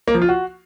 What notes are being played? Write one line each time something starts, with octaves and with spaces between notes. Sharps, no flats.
A#3
F3
F4
F#4